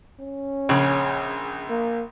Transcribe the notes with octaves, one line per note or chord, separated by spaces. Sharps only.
C#4
A#1 C#3
A#3